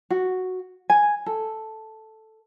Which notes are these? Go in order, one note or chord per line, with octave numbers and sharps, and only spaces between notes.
F#4
G#5
A4